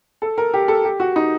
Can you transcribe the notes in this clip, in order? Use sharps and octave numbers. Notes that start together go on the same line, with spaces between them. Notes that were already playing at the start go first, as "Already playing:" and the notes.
A4
A#4
G4
A4
G4
F#4
D#4